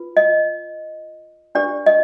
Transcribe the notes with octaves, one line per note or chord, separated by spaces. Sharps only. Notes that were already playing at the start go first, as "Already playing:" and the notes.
Already playing: F4 B4
D#5
D4 G4 B4 D5
D#5